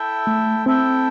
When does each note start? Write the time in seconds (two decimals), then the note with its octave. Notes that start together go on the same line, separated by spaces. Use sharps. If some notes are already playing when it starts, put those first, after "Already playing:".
Already playing: E4 A4 E5 G5
0.27 A3
0.66 C4 E4 A4 E5 G5